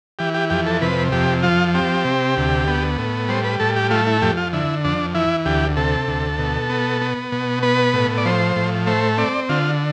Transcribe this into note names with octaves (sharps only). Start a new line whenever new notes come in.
E3 G4
G4
F2 G4
A4
C3 B4
F2 G4
F3 F4
C4 G4
C3
D2
B3
A2
G3 C5
B4
A2 A4
G4
A3 F4
E4
F2 G4
F4
D3 E4
F2 D4
E3 E4
D2 G4
C3 A4
D2
B2
B3
B3
B2
B3 B4
A2
D5
F3 C5
A2
A3 C5
C4 D5
D3 F4